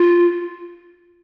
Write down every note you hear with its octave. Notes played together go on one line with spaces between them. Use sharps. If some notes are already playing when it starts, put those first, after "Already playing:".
Already playing: F4